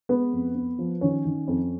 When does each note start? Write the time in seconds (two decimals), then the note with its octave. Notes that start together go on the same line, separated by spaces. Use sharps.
0.09 G#3 B3 B4
0.32 F2
0.55 B3
0.79 F3
1.01 D#3 C#4 C#5
1.25 D#3
1.48 F2